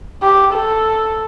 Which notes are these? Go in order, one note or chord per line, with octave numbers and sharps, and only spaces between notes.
G4
A4